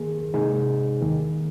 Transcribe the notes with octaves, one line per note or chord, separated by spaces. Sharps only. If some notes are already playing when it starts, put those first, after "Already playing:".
Already playing: D#3 A#3 G#4
C3 G#3 D#4 G#4
D#2 D#3 A#3